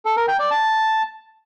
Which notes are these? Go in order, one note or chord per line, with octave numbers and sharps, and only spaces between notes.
A4
A#4
G5
D5
A5